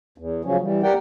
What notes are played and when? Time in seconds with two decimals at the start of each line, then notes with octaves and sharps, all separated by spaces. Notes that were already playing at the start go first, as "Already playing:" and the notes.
0.18 E2
0.45 C#3 F3 F#3 C#4
0.62 E3 G3
0.83 G4 A#4 D5 F#5 G5